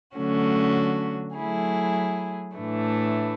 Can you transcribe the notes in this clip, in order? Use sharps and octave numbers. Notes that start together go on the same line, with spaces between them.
D3 F#3 A3 C#4 F#4
F#3 A3 E4 G#4
A2 E3 A3 D4